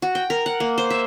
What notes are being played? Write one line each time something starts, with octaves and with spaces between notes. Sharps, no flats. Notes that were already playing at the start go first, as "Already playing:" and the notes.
F#4
G5
A#4
F#5
A#3
C5
E5